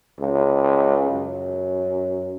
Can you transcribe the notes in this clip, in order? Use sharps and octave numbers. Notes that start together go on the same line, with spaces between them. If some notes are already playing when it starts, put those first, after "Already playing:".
C#2
F#2